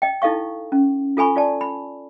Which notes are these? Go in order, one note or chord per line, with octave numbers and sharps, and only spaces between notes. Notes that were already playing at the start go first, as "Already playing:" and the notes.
D#5 G5
D#4 E4 A4 D#5 F5 C#6
C#4
F4 A4 G#5 B5 C#6
F4 D5 A5
B5